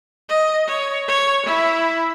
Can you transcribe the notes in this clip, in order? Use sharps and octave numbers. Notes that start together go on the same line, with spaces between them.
D#5
C#5
C#5
E4